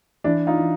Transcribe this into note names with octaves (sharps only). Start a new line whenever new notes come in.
E3 D4 E4
D#4 F4
E3